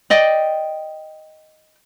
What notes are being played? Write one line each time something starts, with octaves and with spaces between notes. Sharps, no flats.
D5 D#5 G5